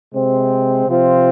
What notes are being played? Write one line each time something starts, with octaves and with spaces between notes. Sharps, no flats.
C3 G#3 C4
C3 F3 C4 F4